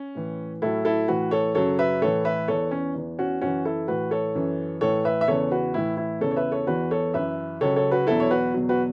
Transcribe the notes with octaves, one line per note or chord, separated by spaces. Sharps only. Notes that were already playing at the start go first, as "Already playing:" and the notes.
Already playing: C#4
A2 E3
A2 F#3 E4 A4
E4 A4
A2 E3 F#4 B4
A4 C#5
F#2 C#3 F#3 A4 C#5
B4 E5
A2 E3 A4 C#5
B4 E5
E2 E3 A4 C#5
C#4
E2 E3
C#4 F#4
F#2 E3 C#4 F#4
E4 A4
A2 E3 F#4 B4
A4 C#5
F#2 E3
A2 E3 A4 C#5
B4 E5
E5
E2 C#3 E3 A4 C#5
F#4 B4
A2 E3 E4
E4
E2 C#3 E3 A4 C#5
C#5
B4 E5
A4 C#5
E2 E3 F#4 B4
A4 C#5
F#2 E3 B4 E5
C#2 C#3 F#3 A4 C#5
A4 C#5
F#4 B4
E2 B2 F#3 E4 A4
C#5
F#4 B4
E2 B2 F#3
F#4 B4